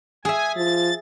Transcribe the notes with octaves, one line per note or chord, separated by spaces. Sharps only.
G#4 E5 G#5
F3 A6